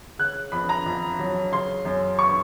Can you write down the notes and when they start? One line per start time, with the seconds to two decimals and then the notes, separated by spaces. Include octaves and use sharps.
0.19 C#3 F#6
0.52 F2 B5
0.69 A#5
0.86 F2
1.19 F#3
1.52 C#3 C6
1.85 F#2
2.19 C#6